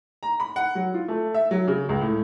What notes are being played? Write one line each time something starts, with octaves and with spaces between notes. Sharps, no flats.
A#5
B5
F#5
F#3
F4
A3
E5
F#3
C#3
C#2
A2